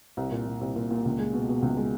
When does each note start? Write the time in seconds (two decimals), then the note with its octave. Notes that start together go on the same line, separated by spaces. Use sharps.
0.17 C2
0.31 A#2
0.47 A#2
0.61 C2
0.76 A#2
0.91 A#2
1.05 C#2
1.19 G#3
1.33 B2
1.48 B2
1.62 C#2
1.77 G#3